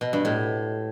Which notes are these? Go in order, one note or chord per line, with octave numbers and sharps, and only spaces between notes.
B2
G2
A2